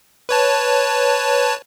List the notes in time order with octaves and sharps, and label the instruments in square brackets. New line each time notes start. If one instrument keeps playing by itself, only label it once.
[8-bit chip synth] B4 C#5 A5